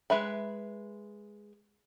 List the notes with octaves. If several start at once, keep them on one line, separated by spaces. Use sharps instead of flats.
G#3 B4 E5 B5